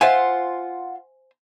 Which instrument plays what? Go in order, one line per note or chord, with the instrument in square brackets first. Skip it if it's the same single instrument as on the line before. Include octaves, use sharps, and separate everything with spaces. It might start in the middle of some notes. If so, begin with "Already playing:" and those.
[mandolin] F4 F#5 [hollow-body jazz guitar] C5 E5 G#5